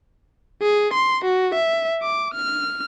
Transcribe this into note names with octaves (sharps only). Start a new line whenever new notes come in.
G#4
C6
F#4
E5
D6
F6